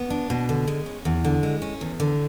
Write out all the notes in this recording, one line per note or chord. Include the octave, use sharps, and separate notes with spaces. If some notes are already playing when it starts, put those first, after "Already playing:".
Already playing: B3
D4
B2
D3
G#3
C#4
E2
D3
G#3
C#4
E2
D3